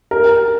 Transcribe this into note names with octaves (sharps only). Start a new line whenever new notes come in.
A#4